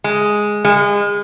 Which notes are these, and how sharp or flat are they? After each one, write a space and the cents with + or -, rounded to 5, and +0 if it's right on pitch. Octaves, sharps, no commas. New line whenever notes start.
G#3 +0
G#3 -30